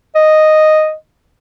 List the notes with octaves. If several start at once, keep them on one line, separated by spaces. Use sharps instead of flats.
D#5